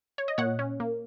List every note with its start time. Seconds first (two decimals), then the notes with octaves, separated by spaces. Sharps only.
0.18 C#5
0.28 D#5
0.38 A#2 C#5 F#5
0.59 C#4
0.80 A#3